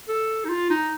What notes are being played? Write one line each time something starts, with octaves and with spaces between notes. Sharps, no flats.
A4
D#4
F4
D#4